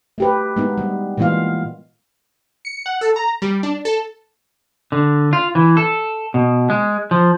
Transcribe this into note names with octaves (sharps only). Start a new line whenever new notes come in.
A3 G4 B4
G#3 B3 D#4
G3
A#2 E3 G#3 B3 F4 F5
C#7
F#5
A4
A#5
G3
D4
A4
D3
F4
E3
A4
B2
G#3
F3